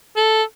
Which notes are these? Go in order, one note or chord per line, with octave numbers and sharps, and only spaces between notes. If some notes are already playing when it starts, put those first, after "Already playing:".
A4